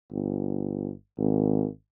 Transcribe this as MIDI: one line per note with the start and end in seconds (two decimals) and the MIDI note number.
0.12 0.90 31
1.18 1.66 32